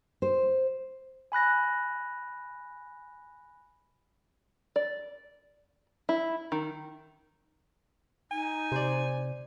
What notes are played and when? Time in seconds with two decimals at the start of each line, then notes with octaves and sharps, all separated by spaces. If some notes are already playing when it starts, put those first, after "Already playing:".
0.22 C5
1.32 G#5 B5 F#6 A#6
4.76 D5
6.09 E4
6.52 D#3
8.31 D#4 G#5
8.72 C3 C5 D5